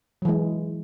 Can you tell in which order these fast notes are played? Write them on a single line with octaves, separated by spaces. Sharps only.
F#3 E3 G#3